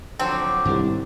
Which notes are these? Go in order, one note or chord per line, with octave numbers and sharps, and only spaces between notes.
D3 F3 F#3 C4
C2 G#2 D#3 D4